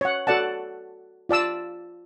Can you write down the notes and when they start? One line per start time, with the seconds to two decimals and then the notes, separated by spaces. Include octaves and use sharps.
0.01 C#5 F#5
0.27 F#4 A4 D5 F#5 A5
1.29 F4 D5 A5 E6